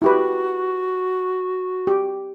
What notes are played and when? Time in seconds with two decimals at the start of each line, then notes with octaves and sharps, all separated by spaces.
0.02 E4 F#4 G4 B4
1.87 G4